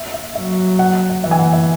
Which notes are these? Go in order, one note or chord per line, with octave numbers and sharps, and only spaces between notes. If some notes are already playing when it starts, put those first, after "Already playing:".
Already playing: E5
E5
F#3 E5
F#5
F#5
E3 E5
G#5
F#5
E5